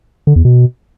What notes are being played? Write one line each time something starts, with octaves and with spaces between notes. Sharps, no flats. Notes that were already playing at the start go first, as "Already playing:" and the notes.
D3
E2
B2